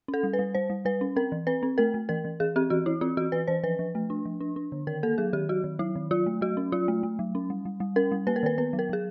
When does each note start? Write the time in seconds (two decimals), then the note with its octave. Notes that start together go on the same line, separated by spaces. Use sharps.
0.08 C#4
0.14 A4
0.23 G3
0.33 B4
0.39 G3
0.55 G3 C5
0.70 G3
0.85 G3 B4
1.01 C#4
1.16 C4 A#4
1.32 E3
1.47 C4 B4
1.63 C4
1.78 A3 A#4
1.94 A3
2.09 E3 A#4
2.25 E3
2.40 E3 G#4
2.56 C4 G4
2.70 E3 F#4
2.86 E3 E4
3.01 C4 F4
3.17 E3 F#4
3.32 E3 B4
3.47 E3 C5
3.63 F3 B4
3.79 F3
3.95 A3
4.10 D4
4.25 F3
4.40 D4
4.56 D4
4.72 D3
4.87 D#3 A#4
5.03 A#3 A4
5.18 F#3 G#4
5.33 D#3 G4
5.49 F#3 F#4
5.64 D#3
5.79 F#3 E4
5.95 D#3
6.11 F#3 F4
6.26 A3
6.41 F#3 F#4
6.57 C#4
6.72 F#3 F4
6.88 A3
7.03 A3
7.19 F#3
7.35 C#4
7.50 G3
7.65 G3
7.80 G3
7.96 C#4 A#4
8.12 G3
8.27 A#3 B4
8.36 A#4
8.43 D#3 B4
8.58 B3 B4
8.73 F#3
8.79 A#4
8.89 F#3 G#4